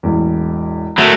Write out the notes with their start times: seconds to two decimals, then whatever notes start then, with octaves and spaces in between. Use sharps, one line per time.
0.03 E1 A1 E2
0.98 F#3 A3 F#4 A#4